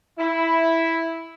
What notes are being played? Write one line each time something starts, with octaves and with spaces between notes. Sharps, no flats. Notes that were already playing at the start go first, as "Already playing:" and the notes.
E4